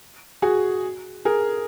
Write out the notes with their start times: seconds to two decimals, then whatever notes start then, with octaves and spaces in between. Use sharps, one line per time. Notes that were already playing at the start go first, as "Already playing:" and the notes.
0.42 F#4 G#4
1.25 G#4 A#4